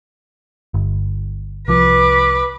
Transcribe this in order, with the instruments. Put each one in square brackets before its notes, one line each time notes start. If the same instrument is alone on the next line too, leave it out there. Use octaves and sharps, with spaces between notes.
[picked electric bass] G1
[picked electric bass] C2 F3 [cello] B4 [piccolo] D6